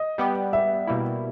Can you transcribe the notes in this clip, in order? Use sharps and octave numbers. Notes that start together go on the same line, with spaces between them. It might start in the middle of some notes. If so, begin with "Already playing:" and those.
Already playing: D#5
G3 B3 G4
E5
B2 G3 A#3 E4